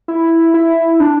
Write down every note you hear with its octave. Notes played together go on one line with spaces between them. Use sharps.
E4
E4
D4